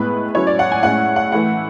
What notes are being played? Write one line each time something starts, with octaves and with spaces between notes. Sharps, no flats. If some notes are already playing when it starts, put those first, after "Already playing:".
Already playing: A2 G#3 B3 E4 B4
F#3 C#4 E4 C#5
D5
F#5
G#5
A2 G#3 C#4 E4 F#5
F#5
E3 A3 E4 F#5